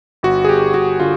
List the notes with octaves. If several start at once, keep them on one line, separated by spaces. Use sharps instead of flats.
G1 F#4
G#4
G1 G4
G1 F#4
D3 F4